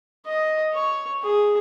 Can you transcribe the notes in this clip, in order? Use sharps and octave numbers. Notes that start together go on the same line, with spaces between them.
D#5
C#5
G#4